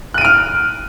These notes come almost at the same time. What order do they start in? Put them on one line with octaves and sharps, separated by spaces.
F#6 D#7 D7 F6